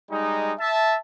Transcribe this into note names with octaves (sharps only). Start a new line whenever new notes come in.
G3 G#3 D#4
E5 A5